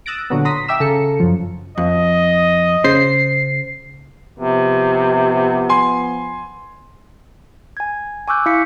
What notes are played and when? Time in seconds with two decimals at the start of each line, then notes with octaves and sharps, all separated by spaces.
0.06 D#6 E6 F#6 A6 A#6 D7
0.30 A#2 D3 F#3 B3
0.45 A#5 C6 D#6 A#6 B6
0.68 E5 G5 D6 E6 B6 E7
0.80 C#3 A4 A#5 C#7
1.20 F#2 F3
1.78 F2 D#5
2.84 C#3 C5 C7
4.38 C3 F3 B3
5.69 G#5 C6
7.77 G#5 G#6
8.28 G#5 C#6 D6 E6 F#6 G6
8.46 E4 F5 D6 B6 C#7